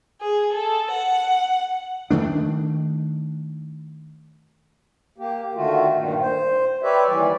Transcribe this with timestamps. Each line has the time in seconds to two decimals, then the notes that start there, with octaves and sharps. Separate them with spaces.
0.21 G#4
0.52 A4
0.91 F#5
2.11 D#3 A3 D4
5.18 A#3 G4
5.55 D3 D#3 A3 F4 F#4
5.95 G2 A#2 D#3
6.21 C5
6.83 G4 B4 C#5 D5 E5
7.08 D#2 E3 G3 D5